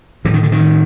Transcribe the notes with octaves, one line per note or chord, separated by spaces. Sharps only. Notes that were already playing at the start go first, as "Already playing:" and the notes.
A2 E3
D#3
D3
D#3